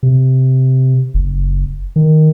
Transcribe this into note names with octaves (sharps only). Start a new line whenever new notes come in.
C3
F#1
D#3